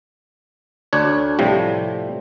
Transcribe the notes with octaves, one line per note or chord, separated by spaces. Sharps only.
D2 D4 C#5
A2 C3 F3 G3